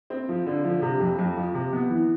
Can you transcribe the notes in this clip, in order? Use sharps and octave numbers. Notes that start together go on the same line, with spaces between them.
C4
F3
D3
F3
C3
F2
F2
F3
C3
B3
E3